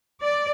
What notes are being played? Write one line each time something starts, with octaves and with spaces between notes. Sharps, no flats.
D5